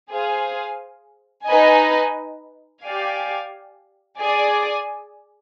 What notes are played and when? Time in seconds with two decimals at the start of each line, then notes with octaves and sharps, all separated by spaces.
0.10 G#4 C5 F5 G#5
1.47 D#4 B4 D#5 G#5
2.83 G4 D5 F5 G#5
4.20 G#4 D5 G#5